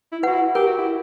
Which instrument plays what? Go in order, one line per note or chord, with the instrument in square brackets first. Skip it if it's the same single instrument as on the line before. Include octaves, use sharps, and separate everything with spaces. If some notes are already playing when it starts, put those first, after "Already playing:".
[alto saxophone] E4
[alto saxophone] F#4 [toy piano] B4 F#5
[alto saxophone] E4
[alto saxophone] G4 [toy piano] A#4
[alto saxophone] F#4
E4